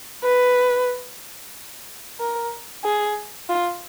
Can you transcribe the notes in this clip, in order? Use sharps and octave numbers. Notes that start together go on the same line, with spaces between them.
B4
A#4
G#4
F4